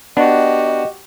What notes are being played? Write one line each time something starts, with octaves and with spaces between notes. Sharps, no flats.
B3 D4 F#4 G4 D#5